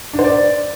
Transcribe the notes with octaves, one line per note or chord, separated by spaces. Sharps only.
D4
C5
D5